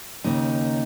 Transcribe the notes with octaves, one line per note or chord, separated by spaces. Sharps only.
D#2 C#3 A#3 D#4